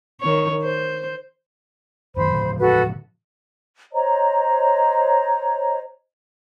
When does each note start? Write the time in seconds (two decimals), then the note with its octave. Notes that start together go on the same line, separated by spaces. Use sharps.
0.21 D#3 C#5
0.63 C5
2.17 F#2 D#3 C5 B5
2.32 A2 D3 F3
2.60 F#4 A4 B4
3.92 C5 C#5 D#5 A#5